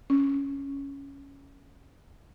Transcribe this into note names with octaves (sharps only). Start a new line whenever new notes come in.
C#4